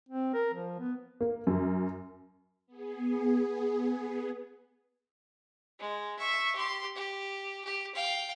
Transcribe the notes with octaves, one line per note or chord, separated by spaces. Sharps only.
C4
A#4
F3
B3
A#3
F#2
B3 G#4
G#3
E5 C#6
G4 C6
G4
G4
F5 G5